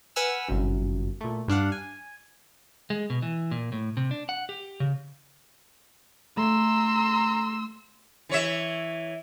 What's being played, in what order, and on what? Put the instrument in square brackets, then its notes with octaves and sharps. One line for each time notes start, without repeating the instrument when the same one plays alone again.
[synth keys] B4 F#5 G#5 E6 F6
G1 C2 F#2
A#2 A3
G2 D4 F5 F#5
G#5
[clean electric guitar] G#3
B2
E3
A#2
A2
C3
D4
F#5
G4
C#3
[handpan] A3 [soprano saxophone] A#5 [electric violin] C6 E6
[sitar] E3 C#5 E5